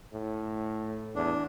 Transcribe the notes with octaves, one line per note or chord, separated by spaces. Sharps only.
A2
E2 D4